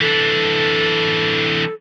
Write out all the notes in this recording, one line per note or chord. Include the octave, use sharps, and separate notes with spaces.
E3 D4 A4